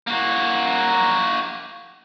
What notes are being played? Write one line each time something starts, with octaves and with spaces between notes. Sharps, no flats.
A#3 F#4